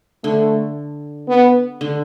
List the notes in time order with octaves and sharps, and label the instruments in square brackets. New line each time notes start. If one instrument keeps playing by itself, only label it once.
[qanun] D3 [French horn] A3
[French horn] B3
[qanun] D3